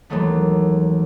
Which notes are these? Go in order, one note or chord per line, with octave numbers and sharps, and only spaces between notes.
D#2 E3 F#3 G#3 A3 B3